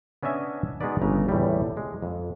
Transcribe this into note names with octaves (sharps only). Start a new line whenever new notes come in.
B3 C#4 D4 D#5 E5 G#5
G#3 B3 D#4 F#4 B4 D5
G1 C#3 A#5
E2 A2 C3 G3
G#3
F2